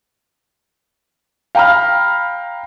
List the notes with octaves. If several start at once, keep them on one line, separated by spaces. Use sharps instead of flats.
F5 G5 A#5 B5 F6